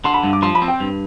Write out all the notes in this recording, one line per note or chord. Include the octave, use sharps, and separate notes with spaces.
D3 C6
B5
G2
D6
F3 C6
B5
C4
G5
G2